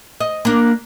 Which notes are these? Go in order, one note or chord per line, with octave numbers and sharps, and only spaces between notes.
D#5
A#3 D4